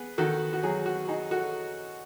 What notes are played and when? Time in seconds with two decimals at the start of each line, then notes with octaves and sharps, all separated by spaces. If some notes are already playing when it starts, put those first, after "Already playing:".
Already playing: B3 G#4
0.18 D#3 F#4 A4
0.53 F#4
0.63 F#3 G#4
0.86 F#4
1.08 D#4 G#4
1.31 F#4 A4